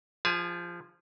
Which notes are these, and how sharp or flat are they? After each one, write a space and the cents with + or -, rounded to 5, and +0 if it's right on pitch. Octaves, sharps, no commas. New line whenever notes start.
F3 -10 G#4 -35 G#5 +45